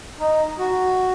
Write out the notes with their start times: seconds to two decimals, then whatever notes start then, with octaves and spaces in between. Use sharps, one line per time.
0.20 D#4
0.59 F#4